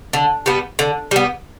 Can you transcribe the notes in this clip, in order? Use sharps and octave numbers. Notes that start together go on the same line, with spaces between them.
D3
G3 B3
D3
G3 B3